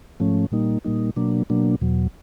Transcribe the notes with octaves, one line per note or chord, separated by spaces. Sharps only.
G#2 F3 A3 C#4
A#2 G3 A#3 D#4
A#2 G3 A#3 D#4
B2 F#3 A#3 D4
B2 F#3 A#3 D4
E2 B2 F#3